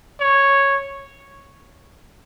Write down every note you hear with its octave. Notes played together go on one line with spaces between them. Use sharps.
C#5